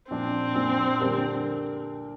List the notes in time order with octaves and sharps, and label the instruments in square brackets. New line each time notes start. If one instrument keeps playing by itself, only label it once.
[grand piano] A#2 F3 D4 [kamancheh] C4
[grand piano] A#2 F3 D4
D3 G3 D4 G4 A#4